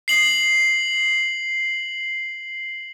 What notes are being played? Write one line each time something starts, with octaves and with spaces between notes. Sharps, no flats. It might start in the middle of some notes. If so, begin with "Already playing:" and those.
C7 F#7